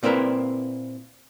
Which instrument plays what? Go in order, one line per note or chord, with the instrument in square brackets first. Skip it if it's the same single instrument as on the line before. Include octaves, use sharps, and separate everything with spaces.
[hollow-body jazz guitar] A#2 C4 E4 A#4 B4